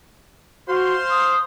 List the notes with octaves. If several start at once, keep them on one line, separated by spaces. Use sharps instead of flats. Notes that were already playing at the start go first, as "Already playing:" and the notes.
F#4 C5 F5 C6
D#6